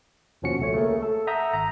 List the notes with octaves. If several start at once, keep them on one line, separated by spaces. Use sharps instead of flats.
D#2 B2 F3 C#4 F#4 C#7
C#2 A3 C#5
A3 A#3 G#4 A#4
A4
E5 F#5 A#5 D#6 G6
G#1 A#5